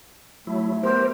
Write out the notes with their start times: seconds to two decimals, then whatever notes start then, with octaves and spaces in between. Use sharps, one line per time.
0.47 F#3 A3 E4
0.83 B3 G4 A#4 C5